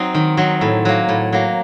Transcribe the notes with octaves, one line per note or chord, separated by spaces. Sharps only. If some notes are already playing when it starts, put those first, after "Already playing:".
Already playing: F#3 C4 D#4
D#3
F#3 C4 D#4
A2
F#3 A#3
A2
F#3 A#3